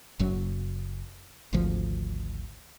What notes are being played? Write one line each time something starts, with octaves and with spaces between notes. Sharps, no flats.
F#1 F#2 F#3
G#1 D2 F3